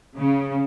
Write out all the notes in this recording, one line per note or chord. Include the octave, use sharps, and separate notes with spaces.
C#3